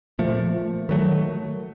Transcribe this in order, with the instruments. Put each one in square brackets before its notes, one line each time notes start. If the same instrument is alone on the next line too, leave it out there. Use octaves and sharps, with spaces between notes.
[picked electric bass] A#2 F3 A3
D#3 F#3 A3